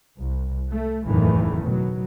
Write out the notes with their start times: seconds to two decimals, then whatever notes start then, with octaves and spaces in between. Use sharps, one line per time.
0.17 C2
0.70 A3
1.04 F#1 E2 A2 D#3 E3 A3
1.64 B2 F#3